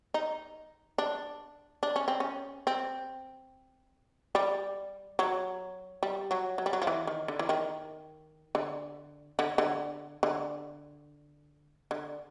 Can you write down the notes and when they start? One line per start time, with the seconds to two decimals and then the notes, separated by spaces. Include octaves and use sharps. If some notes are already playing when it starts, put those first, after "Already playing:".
0.14 D#4
0.98 D4
1.83 D4
1.96 C#4
2.08 C4
2.20 C#4
2.67 C4
4.35 G3
5.19 F#3
6.03 G3
6.31 F#3
6.58 F#3
6.66 G3
6.73 F#3
6.82 F3
6.87 E3
7.07 D#3
7.28 D3
7.39 E3
7.49 D#3
8.55 D3
9.39 D3
9.58 D3
10.23 D3
11.91 D3